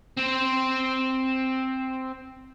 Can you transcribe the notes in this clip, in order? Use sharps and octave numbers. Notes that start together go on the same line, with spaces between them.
C4 C5